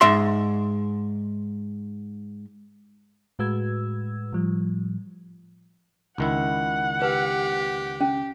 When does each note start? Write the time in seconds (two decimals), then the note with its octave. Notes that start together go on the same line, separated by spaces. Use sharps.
0.01 G#2 E5 C6
3.39 A2 G#3 F#4 B4 E6 G#6
4.33 A2 F3 G3
6.18 C#2 D#3 E4 F#5
7.02 G4 B4
8.01 C#4